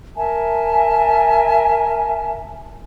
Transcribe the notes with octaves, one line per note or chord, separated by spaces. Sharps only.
A#4 E5 G#5 A5